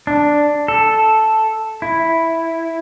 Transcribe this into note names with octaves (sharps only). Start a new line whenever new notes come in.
D4
A4
E4